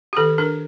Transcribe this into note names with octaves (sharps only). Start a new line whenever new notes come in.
G4
D#3 A4
D4 A#4